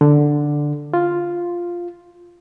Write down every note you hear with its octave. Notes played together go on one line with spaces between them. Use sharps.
D3
F4